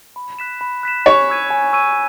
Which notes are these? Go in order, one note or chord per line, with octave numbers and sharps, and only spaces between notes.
B5
F#6 B6 E7
B5
F#6 B6 E7
C#5 G#5
C#6 E6 G#6 D#7
G#5
C#6 E6 G#6 D#7